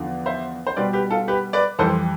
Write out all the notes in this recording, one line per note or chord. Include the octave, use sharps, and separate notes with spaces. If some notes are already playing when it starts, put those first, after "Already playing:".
Already playing: E2 D3 F3
C5 E5
C5
B2 G3 B4 D5
G4 B4
F4 A4
G4 B4
B4 D5
F2 E3 G3 A4 C5